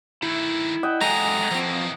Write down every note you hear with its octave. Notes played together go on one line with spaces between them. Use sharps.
D#3 A3 E4
D#5 F#5 G5
E3 F#3 G#3 A4 G#5 A#5
E3 F3 A#3 C4